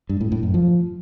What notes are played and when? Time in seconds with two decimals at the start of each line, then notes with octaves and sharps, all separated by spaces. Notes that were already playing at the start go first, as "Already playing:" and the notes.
0.09 G2
0.21 A2
0.32 A2
0.43 F#2
0.54 F3